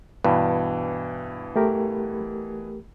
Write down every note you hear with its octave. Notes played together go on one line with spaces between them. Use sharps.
G2 B2 E3 B4
A3 G4 A#4